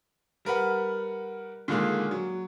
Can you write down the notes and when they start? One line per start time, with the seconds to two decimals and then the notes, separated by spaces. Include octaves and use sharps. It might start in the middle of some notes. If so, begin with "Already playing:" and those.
0.45 G3 A#4 B4 F#5
1.68 A#2 D3 D#3 G#3 A#3 G#4
2.11 F#3